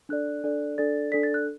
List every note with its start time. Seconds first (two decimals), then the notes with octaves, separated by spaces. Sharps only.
0.09 D4 A4 D5 F#6
0.44 D4 A4 D5
0.78 D4 A4 D5 A6
1.12 D4 A4 D5 B6
1.23 A6
1.34 F#6